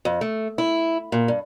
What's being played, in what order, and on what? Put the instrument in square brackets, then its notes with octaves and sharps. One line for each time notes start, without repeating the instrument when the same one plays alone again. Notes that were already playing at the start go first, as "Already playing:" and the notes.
[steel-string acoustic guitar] F2
A3
E4
A#2
G2